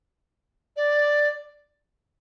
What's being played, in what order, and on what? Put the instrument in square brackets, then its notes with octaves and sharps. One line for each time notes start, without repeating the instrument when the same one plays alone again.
[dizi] D5